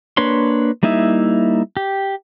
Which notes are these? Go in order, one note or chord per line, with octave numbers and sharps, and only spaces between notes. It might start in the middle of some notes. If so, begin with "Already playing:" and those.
A#3 D4 B4 C#5 C6
G3 A#3 D#4 E4 E5
G4